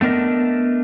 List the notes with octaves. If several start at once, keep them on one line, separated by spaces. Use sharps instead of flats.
A3 B3 D4 A#4 D#5